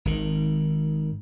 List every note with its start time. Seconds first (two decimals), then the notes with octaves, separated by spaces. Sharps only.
0.05 G#1 D#3